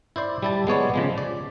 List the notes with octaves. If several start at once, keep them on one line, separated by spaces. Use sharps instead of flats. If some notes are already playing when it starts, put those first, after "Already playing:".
E4 C5 D5
G3 E4 A5
G#3 B3 C#5 D5
C#3 F3 G#3
D5